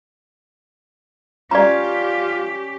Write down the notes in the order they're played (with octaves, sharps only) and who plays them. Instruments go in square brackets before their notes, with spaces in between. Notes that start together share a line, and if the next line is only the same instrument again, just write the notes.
[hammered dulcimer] C#4 [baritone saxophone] F4 [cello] G4 [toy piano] D5 A#5